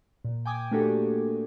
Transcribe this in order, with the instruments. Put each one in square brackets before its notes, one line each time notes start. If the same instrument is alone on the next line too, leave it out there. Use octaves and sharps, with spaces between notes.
[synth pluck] A#2
G5 G#5 D6 D#6 G#6
A3 A#3 D4 F#4 G4 A4